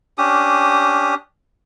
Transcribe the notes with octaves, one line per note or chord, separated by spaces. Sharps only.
C#4 D4 G4 D#6